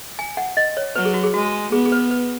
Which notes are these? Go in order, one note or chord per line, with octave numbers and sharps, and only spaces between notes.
G#5
F#5
D#5
C#5
F#3 B4
G#4
F#4
G#4
G#3 F#4
B3 G#4
G#4
B4
B4